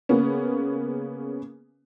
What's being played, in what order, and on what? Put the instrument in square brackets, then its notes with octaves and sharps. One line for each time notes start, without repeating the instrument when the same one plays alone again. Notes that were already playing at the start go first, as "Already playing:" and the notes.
[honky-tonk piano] C#3 A#3 B3 C#4